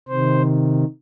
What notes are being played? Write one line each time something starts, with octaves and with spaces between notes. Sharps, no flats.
C3 D#3 C5